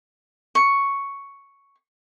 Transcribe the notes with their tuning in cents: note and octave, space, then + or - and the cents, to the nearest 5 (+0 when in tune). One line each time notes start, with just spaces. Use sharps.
C#6 +0